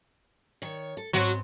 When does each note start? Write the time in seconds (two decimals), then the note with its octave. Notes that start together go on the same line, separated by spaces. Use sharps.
0.62 D#3 C#5
0.97 A4
1.13 G#2 F#3 B3 C4 F#4